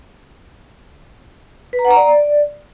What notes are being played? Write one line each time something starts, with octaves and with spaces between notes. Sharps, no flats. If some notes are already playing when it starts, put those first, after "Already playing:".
B4
A#5
F#5
A#5
D5